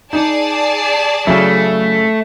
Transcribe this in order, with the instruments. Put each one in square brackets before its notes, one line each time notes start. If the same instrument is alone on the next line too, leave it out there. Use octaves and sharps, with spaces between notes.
[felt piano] D#4 [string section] G#4 D5 A5
[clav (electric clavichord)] C#3 E4 [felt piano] F#3 [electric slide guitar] A3